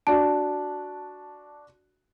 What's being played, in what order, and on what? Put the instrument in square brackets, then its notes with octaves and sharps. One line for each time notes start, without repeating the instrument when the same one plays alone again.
[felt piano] D4 F#4 D5 [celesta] A5